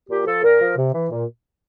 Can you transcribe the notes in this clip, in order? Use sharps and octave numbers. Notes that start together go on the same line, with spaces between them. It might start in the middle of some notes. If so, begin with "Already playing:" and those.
A#2 G4
F3 A4
A#2 A#4
F3
C3
E3
A#2